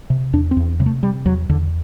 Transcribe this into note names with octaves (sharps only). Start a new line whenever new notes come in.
C3
E2 D4
C4
E2
C3 G3
A3
C3 G3
E2 F#3
E2 D3